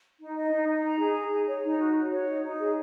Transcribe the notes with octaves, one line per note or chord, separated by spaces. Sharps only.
D#4
D#5
D#4
D#4
A#5
G#4
A#5
G#4
C#5
D#4
F#4
F#4
C#5
D#4
D#4
G#4